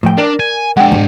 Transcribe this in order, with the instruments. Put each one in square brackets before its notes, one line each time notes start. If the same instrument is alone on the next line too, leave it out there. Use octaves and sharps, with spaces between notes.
[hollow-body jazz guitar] A2 F3 G5
[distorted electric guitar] D4 [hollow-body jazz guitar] A#4 D5
[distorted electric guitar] G#5
[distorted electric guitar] G#3 D4 [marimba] F#5 G5
[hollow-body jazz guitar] D2 G#2